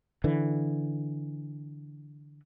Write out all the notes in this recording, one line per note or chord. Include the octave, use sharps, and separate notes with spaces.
D3 E3